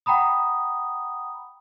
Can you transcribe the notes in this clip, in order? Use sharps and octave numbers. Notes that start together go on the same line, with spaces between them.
F#5 G5 A#5 B5 D#6